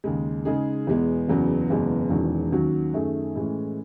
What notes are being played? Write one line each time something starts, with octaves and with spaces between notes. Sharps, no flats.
D#2 C#3 G#3
C#3 G#3 D#4 G#4
E2 B2 G#3 B3
F#1 E2 C#3 F#3 B3
F#1 E2 B2 G#3 B3
E1 E2 D#3 F#3 C#4
D#2 D#3 F#3 C#4 F#4
F#2 D#3 A3 C#4 G#4
A2 E3 G#3 C#4